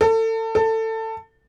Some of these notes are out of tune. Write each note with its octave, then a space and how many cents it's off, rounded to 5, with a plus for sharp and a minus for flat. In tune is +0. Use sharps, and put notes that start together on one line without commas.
A4 +30
A4 +20